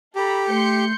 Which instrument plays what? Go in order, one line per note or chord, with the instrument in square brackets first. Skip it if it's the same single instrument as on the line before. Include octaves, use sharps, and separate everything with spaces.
[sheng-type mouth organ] G4 [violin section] A4 A#5 B5
[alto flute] A3 [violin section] C6 G6 C#7